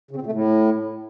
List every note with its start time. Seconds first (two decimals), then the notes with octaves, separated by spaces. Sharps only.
0.11 C#3
0.16 C4
0.21 A#2
0.26 A3
0.32 A2